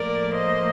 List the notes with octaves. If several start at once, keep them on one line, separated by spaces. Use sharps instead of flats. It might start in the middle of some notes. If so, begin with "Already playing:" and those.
Already playing: A2 F3 A#3 A#4 D5
C5 D#5